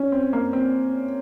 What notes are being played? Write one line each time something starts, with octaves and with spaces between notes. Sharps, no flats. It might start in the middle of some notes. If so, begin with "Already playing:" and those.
Already playing: C#4
C4
A#3
C4